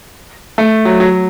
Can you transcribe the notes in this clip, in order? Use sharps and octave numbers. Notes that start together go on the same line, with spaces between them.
A3
F#3
F#3